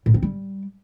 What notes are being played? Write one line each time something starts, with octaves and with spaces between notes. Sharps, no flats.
A2
C4
G3